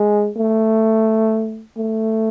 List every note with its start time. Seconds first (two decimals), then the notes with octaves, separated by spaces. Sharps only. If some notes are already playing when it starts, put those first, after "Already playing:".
Already playing: G#3
0.37 A3
1.77 A3